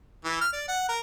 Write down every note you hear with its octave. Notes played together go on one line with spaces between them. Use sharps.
E3
F6
D5
F#5
A#4